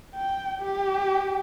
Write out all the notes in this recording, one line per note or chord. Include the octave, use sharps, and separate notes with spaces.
G5
G4